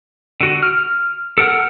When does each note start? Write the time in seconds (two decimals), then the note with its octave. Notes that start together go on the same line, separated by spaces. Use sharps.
0.41 D3 F#4
0.63 F6
1.38 A4 A#4 F#5 F6